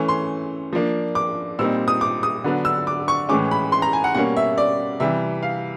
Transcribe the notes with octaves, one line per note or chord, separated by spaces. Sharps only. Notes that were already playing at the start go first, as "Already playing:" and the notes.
Already playing: E3 A3 C#4
C6
F3 A#3 D4
D6
A#2 G3 C4 D#4 E6
D#6
D6
D#6
D3 F#3 B3 D4
E6
D6
C#6
A2 E3 G#3 C#4 D6
B5
C6
A#5
G#5
F#5
B2 G3 A#3 C#4 F#5
E5
D5
C3 E3 G3 E5
F5